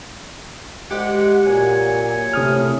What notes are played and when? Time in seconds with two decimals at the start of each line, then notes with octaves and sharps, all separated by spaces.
0.91 D2 G#3 G4 F#5
1.46 A#2 F#3 C#5 G#5
2.33 A2 C3 D#6 F6